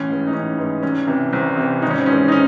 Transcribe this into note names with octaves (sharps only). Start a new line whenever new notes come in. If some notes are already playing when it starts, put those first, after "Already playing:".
Already playing: A1 C#4
G#2 E3
D#4
A1 C#4
G#2 E3
C2 C#4
C3 E3
C2 C4
C3 E3
G#1 D#4
C#4
C4
G#2 E3 C#4
D#4
C#4